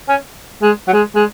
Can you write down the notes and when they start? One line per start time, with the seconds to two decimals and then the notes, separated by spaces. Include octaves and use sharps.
0.09 C#4
0.62 G#3
0.88 F#3
0.93 G#3
1.15 G#3